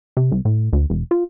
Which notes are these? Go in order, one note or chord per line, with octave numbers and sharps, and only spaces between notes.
C3
C2
A2
D2
E1
F4